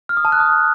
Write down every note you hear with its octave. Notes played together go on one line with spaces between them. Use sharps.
F6
D#6
A5
F#6
D#6